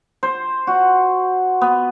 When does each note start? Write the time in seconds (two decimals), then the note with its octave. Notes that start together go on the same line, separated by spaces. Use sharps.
0.23 C5
0.67 F#4
1.61 B3